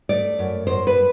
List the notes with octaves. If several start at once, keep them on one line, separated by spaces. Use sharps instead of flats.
A3 D5
F#2
F#2 C5
B4